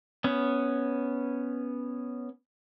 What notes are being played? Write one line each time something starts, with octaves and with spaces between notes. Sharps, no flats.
B3 C#4